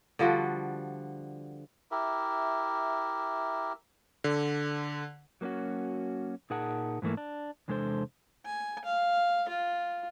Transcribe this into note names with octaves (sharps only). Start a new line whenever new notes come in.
D3 F3 G3 F#4
E4 G4 A#4 E5
D3
F#3 A#3 C4 C#4 F#4
A#2 D#4 G#4 A#4 F#5 A5
G#2 E3 A3 A#3
D4
E2 C3 G#3 D4 A4 C5
G#5
F5
F4